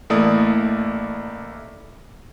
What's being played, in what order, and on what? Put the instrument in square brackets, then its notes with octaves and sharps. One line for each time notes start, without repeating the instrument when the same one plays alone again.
[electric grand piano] A1 A3 A#3 E4 D5 D#6